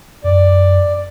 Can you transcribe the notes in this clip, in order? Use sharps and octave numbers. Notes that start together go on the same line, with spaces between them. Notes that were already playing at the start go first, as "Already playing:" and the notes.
F#2 D5